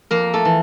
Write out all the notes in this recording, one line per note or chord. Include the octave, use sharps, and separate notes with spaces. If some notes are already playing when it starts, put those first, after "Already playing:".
F2 A#3 A#4
A3 A4
E3